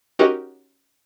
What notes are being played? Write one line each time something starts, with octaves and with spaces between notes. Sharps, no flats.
C#4 D#4 F#4 G4 A#4 D#5